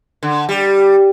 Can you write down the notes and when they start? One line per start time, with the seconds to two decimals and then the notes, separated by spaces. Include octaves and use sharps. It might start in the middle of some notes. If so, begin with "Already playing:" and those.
0.23 D3
0.49 G3